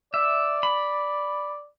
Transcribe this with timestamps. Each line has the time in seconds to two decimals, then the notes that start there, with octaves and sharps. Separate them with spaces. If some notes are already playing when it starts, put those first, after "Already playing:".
0.14 D5 E5
0.63 B5